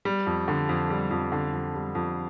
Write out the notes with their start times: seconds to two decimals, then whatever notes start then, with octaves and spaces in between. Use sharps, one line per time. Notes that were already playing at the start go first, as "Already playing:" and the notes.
0.05 G3
0.27 F2
0.48 D3
0.69 F2
0.90 G3
1.11 F2
1.32 D3
1.53 F2
1.75 G3
1.95 F2